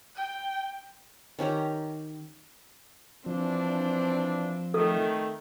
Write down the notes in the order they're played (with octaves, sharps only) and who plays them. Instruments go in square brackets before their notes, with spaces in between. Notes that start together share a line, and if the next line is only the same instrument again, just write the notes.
[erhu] G5
[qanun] D#3 C#4 G4 A#5
[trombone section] E3 D4 [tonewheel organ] F3 [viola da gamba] C4
[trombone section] D#3 A3 [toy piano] A4